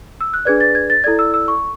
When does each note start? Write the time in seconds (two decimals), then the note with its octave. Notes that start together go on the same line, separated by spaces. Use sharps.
0.21 E6
0.34 F#6
0.45 D4 G#4 B4 D5 G#6
0.60 A6
0.75 G#6
0.90 A6
1.04 E4 A4 D5 G#6
1.19 E6
1.34 E6
1.48 C#6